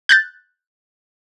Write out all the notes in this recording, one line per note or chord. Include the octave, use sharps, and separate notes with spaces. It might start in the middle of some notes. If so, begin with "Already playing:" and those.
F#6 G6 A6